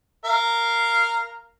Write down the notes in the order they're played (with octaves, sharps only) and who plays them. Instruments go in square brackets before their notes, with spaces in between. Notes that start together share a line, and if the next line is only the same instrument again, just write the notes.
[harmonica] A#4 F5